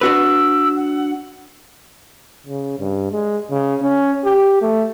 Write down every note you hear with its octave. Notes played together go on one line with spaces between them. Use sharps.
D4 F#4 B4 E6
F#5
C#3
G2
G#3
C#3
C#4
G4
A3